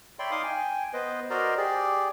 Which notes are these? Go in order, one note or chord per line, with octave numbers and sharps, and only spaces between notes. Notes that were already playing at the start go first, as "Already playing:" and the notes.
C#5 D5 E5 G5 B5 C6
D#4 F5 C6 D6 D#6
G5 G#5
B3 B4 C5 D#5
F#4 A#4 C5 D5 D#5 A#5
G4 G#4 D5